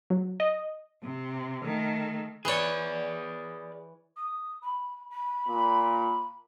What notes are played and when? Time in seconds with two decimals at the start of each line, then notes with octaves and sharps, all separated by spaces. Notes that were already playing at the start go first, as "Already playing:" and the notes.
0.10 F#3
0.40 D#5
1.03 C3
1.63 D#3 A3
2.45 E3 G#4 C#5 D5
4.16 D#6
4.62 B5
5.10 B5
5.48 A#2